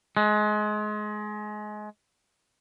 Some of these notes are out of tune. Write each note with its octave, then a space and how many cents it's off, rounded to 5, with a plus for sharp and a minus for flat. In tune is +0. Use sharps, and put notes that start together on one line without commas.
G#3 +25